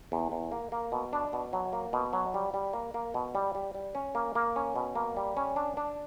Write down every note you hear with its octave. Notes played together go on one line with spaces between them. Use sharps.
E2
E2
A#3
A#3
B2
D4
B2
F#3
A#3
B2
F#3
G3
G3
A#3
A#3
B2
G3
G3
G3
C#4
A#3
A#3
C#4
B2
A#3
G3
C#4
D4
D4